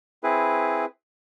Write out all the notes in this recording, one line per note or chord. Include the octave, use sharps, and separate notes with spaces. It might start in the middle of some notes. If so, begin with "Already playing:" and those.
C4 E4 G#4 B4